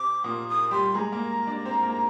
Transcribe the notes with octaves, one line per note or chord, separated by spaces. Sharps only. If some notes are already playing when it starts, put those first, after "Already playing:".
Already playing: C3 C4 D6
A#2 A#3 D#6
D#6
G3 G4 C6
G#3 G#4 A#5
A#3 A#4
D4 D5
C4 C5
A#3 A#4